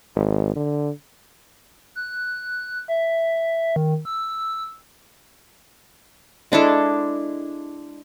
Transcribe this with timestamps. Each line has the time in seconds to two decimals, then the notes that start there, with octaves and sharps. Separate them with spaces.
0.16 G#1
0.56 D3
1.95 F#6
2.88 E5
3.76 D#3
4.05 E6
6.52 G#3 D4 E4 A4